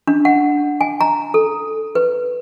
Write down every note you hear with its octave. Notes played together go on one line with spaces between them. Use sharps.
D4
F#5
G#5
A#5
A4
B4